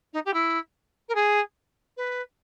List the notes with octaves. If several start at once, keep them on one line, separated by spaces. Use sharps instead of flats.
D#4
G4
E4
A#4
G#4
B4